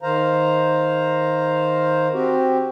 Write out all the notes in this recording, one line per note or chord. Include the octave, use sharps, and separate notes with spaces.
D#3 C5 F5 A#5
C4 F#4 G4